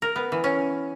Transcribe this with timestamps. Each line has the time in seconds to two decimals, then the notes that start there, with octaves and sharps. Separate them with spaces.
0.02 A#4
0.16 B3
0.32 E3
0.44 C#4